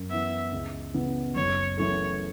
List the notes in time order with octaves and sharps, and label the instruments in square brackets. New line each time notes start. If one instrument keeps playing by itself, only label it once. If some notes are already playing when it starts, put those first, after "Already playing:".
Already playing: [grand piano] F#2
[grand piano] E3 B3 [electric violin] E5
[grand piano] C#2
C#3 E3 B3
[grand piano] F#1 [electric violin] C#5
[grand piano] F#2 E3 A3 [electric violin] C#5